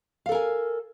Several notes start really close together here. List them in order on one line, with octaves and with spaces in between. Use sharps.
F5 A4 A#4 G#5